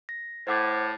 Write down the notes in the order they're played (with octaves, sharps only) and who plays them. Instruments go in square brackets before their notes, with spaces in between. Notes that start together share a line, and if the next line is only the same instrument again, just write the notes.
[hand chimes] A#6
[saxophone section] A2 [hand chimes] C5 F#5 D6